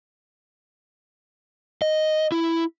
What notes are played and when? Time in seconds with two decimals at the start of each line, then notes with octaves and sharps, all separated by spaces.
1.82 D#5
2.32 E4